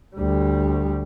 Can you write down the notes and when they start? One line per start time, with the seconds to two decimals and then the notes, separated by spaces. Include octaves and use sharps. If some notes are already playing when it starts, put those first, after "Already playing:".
0.16 D2 G3